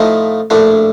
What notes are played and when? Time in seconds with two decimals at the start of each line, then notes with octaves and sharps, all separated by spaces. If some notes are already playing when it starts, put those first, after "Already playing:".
Already playing: A2 F3 A3 D#4
0.50 A#1 A2 A3 D4